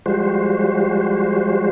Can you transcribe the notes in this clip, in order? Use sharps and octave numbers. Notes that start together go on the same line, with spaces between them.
F3 G3 G#3 F#4 C5